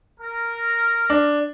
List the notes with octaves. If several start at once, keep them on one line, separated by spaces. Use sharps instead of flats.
A#4
D4